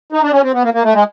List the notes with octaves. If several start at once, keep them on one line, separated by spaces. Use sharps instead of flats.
D#4
D4
C#4
C4
B3
A#3
A#3
A3
G#3